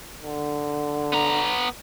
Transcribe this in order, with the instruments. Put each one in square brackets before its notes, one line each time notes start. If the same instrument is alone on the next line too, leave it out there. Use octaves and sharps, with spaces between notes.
[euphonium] D3
[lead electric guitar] B3 A#5